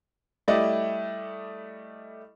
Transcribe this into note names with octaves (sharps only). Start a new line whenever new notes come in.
G3 A3 E4 D5 D#5